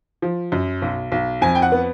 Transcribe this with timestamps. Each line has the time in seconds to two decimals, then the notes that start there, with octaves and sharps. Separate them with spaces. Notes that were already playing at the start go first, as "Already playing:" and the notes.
0.22 F3
0.52 F#2
0.82 B1
1.12 B1
1.41 F2 G#5
1.55 G5
1.62 F#5
1.72 B3